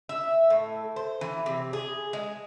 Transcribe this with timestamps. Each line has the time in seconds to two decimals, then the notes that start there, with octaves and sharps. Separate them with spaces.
0.09 E5
0.50 A2
0.96 C5
1.21 E3
1.46 C3
1.73 G#4
2.13 G#3